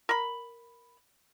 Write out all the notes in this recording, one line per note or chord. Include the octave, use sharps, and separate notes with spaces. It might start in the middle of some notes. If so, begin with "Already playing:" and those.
A#4 B5